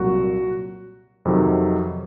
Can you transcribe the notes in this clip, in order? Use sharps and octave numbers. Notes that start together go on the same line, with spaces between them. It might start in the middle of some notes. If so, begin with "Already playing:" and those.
Already playing: C2 A#2 F#3 F#4
F2 C3 D#3 F#3